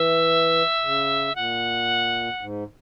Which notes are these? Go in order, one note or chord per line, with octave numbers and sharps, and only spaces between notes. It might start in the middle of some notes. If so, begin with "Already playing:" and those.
Already playing: E3 E5
C#3
A#2 F#5
G#2